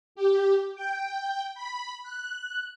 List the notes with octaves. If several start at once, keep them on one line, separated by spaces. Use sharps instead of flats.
G4
G5
B5
F#6